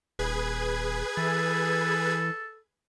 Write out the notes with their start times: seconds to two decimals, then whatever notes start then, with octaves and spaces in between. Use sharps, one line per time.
0.19 D#1 G#4 B4 G#6
1.17 E3 A4